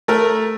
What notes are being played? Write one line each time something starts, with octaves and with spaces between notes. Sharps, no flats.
A3 A#4